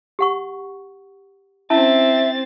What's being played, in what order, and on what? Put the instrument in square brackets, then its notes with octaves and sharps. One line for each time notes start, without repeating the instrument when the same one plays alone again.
[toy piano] G4 F#5 C#6
[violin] C4 A6 [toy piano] C#4 E4 A5 [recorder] E5